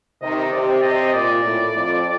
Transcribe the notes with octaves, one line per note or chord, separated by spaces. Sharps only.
C3 D#3 D#5
D#5
C3 D5
C3 D#5
D#5
A#2 D5
A2
F2